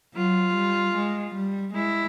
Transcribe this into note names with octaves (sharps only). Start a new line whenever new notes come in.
F#3 F4
G3
G#3
G3
G#3 E4